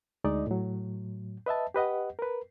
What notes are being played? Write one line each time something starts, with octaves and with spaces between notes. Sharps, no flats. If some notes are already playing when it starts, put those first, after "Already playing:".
D2 G#3 D#4 D5 D#5
A2 F#3
B4 D#5 E5 A5
G4 B4 D#5 F#5
A#4 B4